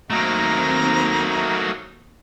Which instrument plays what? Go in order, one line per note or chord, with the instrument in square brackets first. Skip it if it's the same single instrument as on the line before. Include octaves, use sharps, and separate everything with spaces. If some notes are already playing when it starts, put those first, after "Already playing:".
[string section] D#2 C4 [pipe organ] F#3 D#4 [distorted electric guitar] A3 A#3 [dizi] A#5